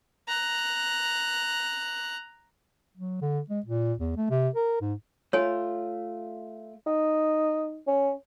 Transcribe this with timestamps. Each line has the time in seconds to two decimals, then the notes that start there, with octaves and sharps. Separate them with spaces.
0.28 A#5 F#6
2.97 F#3
3.22 D3
3.50 G#3
3.66 A#2
3.99 E2
4.17 A3
4.30 C3
4.55 A#4
4.81 G#2
5.33 A3 F4 C#5 G#5
6.86 D#4
7.87 C#4